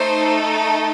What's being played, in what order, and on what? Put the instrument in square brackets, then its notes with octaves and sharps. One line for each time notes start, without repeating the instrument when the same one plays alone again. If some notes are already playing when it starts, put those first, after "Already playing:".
Already playing: [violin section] A3 D#4 A4 C5